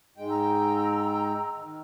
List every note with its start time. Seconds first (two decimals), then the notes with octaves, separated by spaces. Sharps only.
0.17 G#2 G#3 G5
0.30 A#5 E6
1.57 D#3